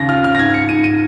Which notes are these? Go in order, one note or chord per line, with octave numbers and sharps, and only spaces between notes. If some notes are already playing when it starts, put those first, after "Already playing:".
Already playing: D#2 C#3 A#6
F4 F6
F6
A#6
G#2 G#6
C#7
G#2 D#7
D#7